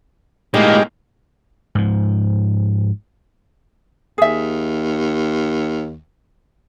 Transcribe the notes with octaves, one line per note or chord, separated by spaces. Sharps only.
A2 G#3 A#3 D#4 G4
G#2 F3
D#2 G#4 E5